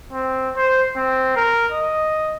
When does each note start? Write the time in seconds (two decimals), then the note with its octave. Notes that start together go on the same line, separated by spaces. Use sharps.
0.13 C4
0.57 C5
0.96 C4
1.36 A#4
1.72 D#5